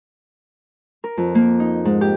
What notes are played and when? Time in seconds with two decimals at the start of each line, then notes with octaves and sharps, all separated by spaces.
1.04 A#4
1.17 F2
1.35 A#3
1.60 D#4
1.85 G#2
2.01 G4